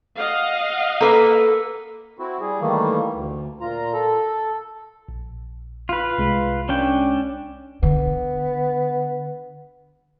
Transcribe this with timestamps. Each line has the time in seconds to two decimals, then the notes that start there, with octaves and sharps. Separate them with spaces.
0.18 D#5 F5 F#5
1.00 A#3 A4 B4
2.19 C4 E4 F#4
2.41 G3 G#4
2.60 D#3 E3 G3 A3 A#3
3.13 D2
3.61 A#2 F4 A#5
3.93 A4
5.09 A#1
5.89 F4 B4
6.18 C2 G#3
6.69 C#4 D4 G5
7.83 D3 B3